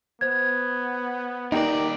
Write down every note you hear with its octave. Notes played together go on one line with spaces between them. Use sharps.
B3 C5 G#6
D#2 D#4 G4 A#4 D5